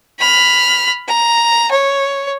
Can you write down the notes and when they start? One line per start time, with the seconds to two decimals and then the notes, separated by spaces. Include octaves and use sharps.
0.19 B5 F6
1.08 A#5
1.71 C#5